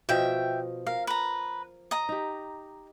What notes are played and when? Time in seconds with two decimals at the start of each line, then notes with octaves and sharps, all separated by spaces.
0.09 B2 F3 E5 G5
0.87 A#4 F5
1.07 B4 A#5
1.91 D#5 A#5
2.09 D#4 G4